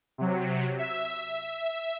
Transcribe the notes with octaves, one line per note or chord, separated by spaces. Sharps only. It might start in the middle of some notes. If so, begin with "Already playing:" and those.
C3 F#3
E5